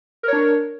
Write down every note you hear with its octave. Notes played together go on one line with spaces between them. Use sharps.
D4 A#4 C#5